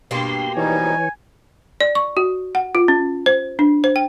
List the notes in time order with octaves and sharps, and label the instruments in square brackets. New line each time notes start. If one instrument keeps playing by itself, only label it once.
[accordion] G2 [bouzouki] B2 A#3 G4 [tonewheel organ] C6
[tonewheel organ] E3 C#5 [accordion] F3 G3 D#4 [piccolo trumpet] G#5
[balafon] D5
C#6
F#4
F#5
F4
C#4
C5
D4
C5
G5